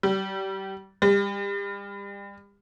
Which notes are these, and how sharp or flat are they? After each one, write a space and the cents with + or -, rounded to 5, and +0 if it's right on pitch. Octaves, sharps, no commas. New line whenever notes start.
G3 -30
G3 +35